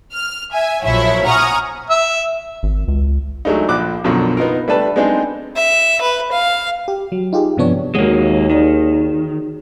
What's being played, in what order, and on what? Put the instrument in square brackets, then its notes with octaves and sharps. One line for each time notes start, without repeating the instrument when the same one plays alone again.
[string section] F6
E5 G#5
A#1 F3 F#3 E4 C#5 E5
F#5 G#5 A#5 C#6 D#6 F6
[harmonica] E5
[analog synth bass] G#1
C#2
[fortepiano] F#3 G#3 A3 D4 D#4
A#1 F3 D6 F#6
B1 F#2 B2 D3 F3 F#3
B3 D#4 F4 A#4
G3 A3 D4 B4 A5
G#3 B3 C4 D4 D#4 G#4
[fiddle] E5
B4
F5
[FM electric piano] G4
F#3
D#4 F4 G4 G#4
G2 C3 F3 B3 D4 C#5
[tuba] D#2 [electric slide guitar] G#3 A#3 [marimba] F#4 C#5 F#5
[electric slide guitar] D#3 [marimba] D#4 G#4 D5